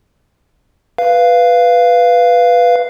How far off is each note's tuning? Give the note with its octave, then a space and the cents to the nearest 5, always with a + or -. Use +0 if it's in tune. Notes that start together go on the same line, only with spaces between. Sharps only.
B4 +0 F5 -10